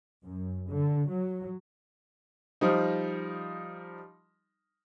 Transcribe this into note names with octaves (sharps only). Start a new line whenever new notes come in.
F#2
D3
F#3
F3 G3 D#4